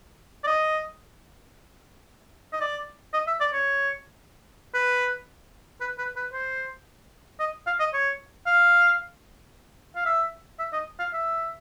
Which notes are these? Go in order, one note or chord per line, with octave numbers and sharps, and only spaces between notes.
D5
D#5
D#5
D5
D#5
E5
D5
C#5
B4
B4
B4
B4
C5
D#5
F5
D#5
C#5
F5
F5
E5
E5
D#5
F5
E5